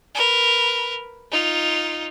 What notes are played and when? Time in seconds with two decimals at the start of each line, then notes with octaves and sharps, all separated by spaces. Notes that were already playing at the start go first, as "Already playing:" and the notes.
0.15 A#4 B4
1.31 D#4 F4